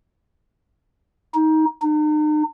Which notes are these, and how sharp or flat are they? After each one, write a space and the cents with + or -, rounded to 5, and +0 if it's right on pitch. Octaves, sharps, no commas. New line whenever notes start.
D#4 +20
D#4 -40